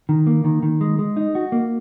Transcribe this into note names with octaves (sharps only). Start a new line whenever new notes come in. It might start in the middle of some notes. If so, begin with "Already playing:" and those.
D#3
A#3
D#3
D#3
G#3
G#3
D#4
F#4
A#3